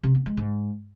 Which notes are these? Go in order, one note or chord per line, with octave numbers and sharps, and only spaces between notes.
C3
B3
G#3
G#2